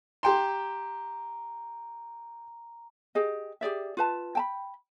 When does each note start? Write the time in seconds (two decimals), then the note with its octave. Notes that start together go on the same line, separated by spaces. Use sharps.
0.23 G4 G5 A#5 C6
3.15 G4 G#4 D#5
3.61 G4 G#4 D5 E5
3.97 F4 B4 A5
4.35 G5 A5 B5